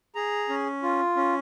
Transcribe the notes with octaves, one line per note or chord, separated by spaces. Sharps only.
G#4 A#5
C#4
F4
C#4